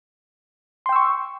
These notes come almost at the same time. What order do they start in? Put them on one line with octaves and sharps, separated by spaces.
C6 G5 E6 C#6